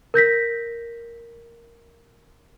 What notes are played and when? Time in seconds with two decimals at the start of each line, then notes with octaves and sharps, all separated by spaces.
0.14 A#4 G6 A#6 B6